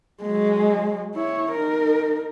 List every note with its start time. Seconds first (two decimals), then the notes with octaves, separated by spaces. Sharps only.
0.23 F#3 G#3
1.15 E4 C#5
1.52 D#4 A#4